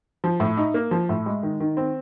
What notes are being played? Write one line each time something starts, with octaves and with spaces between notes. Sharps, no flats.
F3
A2
D#4
A#3
F3
A2
G#3
D#3
D#3
C4